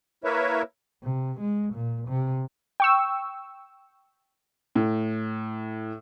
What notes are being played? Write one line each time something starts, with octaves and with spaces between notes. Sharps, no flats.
A#3 E4 A#4 B4 C#5 E5
C3
G#3
A#2
C3
G5 C#6 E6
A2